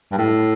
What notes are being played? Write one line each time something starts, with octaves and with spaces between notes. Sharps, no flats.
G2
A2